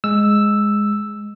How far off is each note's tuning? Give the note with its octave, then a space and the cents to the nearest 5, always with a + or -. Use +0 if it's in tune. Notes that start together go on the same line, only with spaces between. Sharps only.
G#3 +0 E6 +0